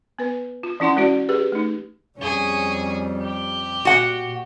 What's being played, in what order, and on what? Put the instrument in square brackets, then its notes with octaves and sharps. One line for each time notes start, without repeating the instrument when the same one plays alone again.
[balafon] B3 B4
F4
E3 C#4 E4 F#5 C6
G#3 C#4 E4 F#4 D5
G4 G#4 B4
A3 D#4
[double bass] F2 G3 [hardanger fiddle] C#4 G#4
[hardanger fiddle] G4
[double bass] A#2 [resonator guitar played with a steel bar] F#4 F#5